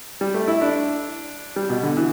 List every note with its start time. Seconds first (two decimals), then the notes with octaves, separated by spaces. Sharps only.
0.21 G3
0.34 A3
0.48 E4
0.61 D4
1.56 G3
1.70 B2
1.83 D3
1.97 E3